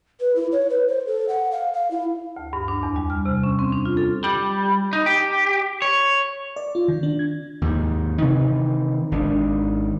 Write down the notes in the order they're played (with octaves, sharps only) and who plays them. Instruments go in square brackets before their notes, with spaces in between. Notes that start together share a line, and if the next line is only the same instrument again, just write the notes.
[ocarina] B4
E4
C#5
B4
C5
A4
F#5
F5
F5
E4
[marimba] D2
G2
D4
E2
G3
F6
C3
C#4
C4
D4
F4
A4
[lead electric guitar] G3
D#4
G4
C#5
[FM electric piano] D5
F4
D#3
D4
G#6
[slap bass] D#2 G#2
C3 D#3 E3 C4
G#1 D#3 D4